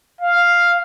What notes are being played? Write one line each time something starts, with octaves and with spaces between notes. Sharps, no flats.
F5